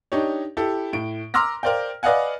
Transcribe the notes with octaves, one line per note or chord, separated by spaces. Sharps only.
D4 D#4 G4 C#5
E4 G4 A4
A2 D7
A#5 C6 D6 E6 F6 A#6
A#4 C5 D5 F5 G5
B4 D5 D#5 F5 F#5 G#5